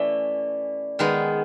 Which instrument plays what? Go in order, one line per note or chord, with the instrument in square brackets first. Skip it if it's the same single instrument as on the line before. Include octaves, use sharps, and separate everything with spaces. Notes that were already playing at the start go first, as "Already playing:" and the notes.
Already playing: [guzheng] E3 A3 C#4 E4 [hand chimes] D5
[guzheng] D#3 G#3 B3